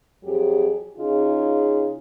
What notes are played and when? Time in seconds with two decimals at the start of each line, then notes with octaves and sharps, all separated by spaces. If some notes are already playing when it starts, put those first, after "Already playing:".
0.24 F2 F#3 G4 G#4
0.97 C#3 D#4 F4 G#4